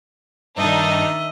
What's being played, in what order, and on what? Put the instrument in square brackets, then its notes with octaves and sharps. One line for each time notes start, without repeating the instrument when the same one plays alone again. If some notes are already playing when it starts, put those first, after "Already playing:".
[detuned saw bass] G2 [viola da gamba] D#3 D#5 [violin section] D4 D#4 [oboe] E5